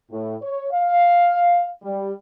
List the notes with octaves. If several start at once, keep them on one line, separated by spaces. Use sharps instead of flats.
A2
C#5
F5
G3